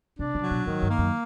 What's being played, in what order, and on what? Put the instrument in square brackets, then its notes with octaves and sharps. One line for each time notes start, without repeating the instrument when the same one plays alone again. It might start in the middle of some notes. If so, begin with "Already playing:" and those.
[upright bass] C3 [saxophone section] D4
[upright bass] C#3
[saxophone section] F#3
[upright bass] B2
[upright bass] G#2 [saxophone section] D#3
[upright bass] G2
[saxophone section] A#3
[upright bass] F#2